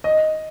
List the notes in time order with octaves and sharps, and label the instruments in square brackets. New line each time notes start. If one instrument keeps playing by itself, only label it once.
[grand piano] D#5